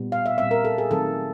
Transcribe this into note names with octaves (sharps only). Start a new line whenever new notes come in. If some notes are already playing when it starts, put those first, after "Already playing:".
Already playing: A#2 G3 B3
F5
E5
A#2 G3 C4 E5
A#4
A4
G#4
D#3 F#3 A3 C4 A4